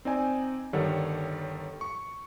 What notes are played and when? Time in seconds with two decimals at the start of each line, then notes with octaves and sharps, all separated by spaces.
0.05 C4 D#4 D5 G#5
0.73 G1 D#3 G3 A4 C#5 F#5
1.81 C#6